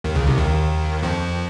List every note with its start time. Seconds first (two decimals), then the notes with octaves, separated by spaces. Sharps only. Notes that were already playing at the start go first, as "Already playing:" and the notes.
0.04 D#2 D#3
0.15 C#2 C#3
0.26 C2 C3
0.37 D#2 D#3
1.03 F2 F3